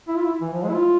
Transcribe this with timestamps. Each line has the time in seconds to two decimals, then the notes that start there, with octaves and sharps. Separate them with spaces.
0.08 E4
0.16 F4
0.26 E4
0.41 E3
0.53 F3
0.63 G#3
0.70 E4
0.74 F4